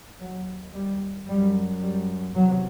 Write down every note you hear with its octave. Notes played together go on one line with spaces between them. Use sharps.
D#2 F#3
G3
F#2 G3
G3
E2 C3 F#3